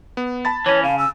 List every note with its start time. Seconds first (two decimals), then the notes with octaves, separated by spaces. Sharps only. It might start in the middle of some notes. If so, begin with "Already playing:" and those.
0.17 B3
0.45 A5 B5 A6
0.66 E3 C#4 C#5
0.84 C#3 F5
0.99 E6